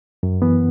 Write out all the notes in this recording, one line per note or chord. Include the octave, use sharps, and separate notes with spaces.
F#2
E3 B3